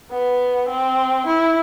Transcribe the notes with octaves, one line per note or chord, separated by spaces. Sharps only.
B3
C4
E4